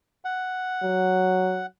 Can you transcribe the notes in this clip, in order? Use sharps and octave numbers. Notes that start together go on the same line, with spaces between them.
F#5
F#3